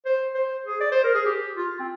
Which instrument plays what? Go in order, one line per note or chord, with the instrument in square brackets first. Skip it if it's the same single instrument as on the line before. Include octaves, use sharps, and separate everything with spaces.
[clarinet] C5
C5
G#4
D5
C5
A#4
G#4
G4
F4
C4